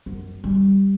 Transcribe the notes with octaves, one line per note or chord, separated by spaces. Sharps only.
F#2
G3